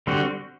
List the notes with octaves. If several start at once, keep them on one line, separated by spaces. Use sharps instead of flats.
D3 G3 C4 F#4